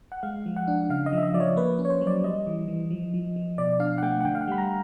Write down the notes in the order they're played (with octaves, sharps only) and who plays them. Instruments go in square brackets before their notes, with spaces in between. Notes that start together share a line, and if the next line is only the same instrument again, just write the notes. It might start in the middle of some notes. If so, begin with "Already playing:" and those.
[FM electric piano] F#5
G#3 F5
F3
F#5
D4
C#3 F5
D#5
F3
E5
D#5
F3 D5
C#5
A#3 B4
C#4
C#5
C5
F#3
D5
G3 D#5
E3
E3
F3
F3
F3
B2 D5
D4 F5
F#5
A3 G5
F#5
D3 G5
F5
F#5
G3 B5
A#5